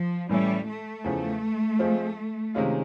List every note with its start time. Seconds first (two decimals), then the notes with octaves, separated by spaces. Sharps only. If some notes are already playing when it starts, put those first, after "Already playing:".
Already playing: F3
0.29 A2 E3 G3 A3 C#4 E4
0.67 A3
1.04 E2 C#3 F3
1.79 F3 G#3 C4 F4
2.54 C3 D#3 G#3 C#4 F4